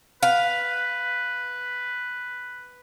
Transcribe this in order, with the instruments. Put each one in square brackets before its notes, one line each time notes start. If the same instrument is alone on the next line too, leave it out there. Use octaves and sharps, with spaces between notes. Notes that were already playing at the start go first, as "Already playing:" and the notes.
[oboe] B4 [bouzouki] F5